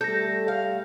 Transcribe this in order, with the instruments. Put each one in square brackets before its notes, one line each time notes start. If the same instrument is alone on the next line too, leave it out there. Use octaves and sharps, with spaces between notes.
[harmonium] G3 A3 [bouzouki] A4 [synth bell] G6 A#6
[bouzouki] F5